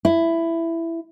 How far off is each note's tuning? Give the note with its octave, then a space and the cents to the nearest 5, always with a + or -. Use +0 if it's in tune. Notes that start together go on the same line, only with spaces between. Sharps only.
E4 +10